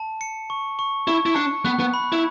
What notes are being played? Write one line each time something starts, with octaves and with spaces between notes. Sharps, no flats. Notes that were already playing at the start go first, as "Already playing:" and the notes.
Already playing: A5
C#7
C#6
C#6
E4 C#6
E4
D4 C#7
B3 F#6
B3
B5
E4